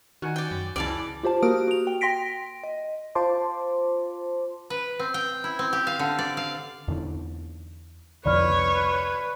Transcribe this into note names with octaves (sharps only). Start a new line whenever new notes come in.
D#3 F#4 F#5 G#5
D5 G5
F#2
C#2 C#3 E3 D5 F5 A5
F4 G4 C5 A5
A#3 F#4 A#4 D#6 F6 D7
F#4 F7
G5
G5 C6 A#6 B6 D7
D#5
F4 C5 A5 C6 D6
B4
C4
G5
E4
C4
G4
F5
D3
D5
F5
E2 D3
C2 F2 D3 B4 C#5 D5 B5 F6